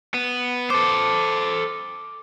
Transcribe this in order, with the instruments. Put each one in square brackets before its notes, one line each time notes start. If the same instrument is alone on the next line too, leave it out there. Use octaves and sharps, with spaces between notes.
[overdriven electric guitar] B3
[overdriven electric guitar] A4 C5 [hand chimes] D6